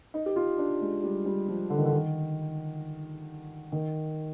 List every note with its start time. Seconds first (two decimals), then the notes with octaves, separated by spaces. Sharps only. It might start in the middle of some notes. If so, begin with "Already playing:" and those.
0.14 D#4
0.26 G4
0.36 F4
0.58 D4
0.81 G#3
1.03 G3
1.26 G3
1.48 F3
1.70 D3
1.78 D#3
1.85 D3
1.92 D#3
3.72 D#3